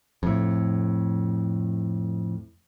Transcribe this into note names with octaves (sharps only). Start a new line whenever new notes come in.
F2 A2